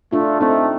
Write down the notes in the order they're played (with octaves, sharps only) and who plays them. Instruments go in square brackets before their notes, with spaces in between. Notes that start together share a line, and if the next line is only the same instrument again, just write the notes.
[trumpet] A3 [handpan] D4 F4
[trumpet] A3 [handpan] C4 D#4